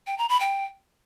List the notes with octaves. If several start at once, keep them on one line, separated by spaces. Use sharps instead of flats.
G5
A#5
B5
G5